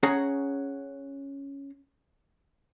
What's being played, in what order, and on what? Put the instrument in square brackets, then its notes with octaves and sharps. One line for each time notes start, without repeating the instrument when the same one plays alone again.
[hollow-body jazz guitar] C#4 G#4 C#5 F#5 A#5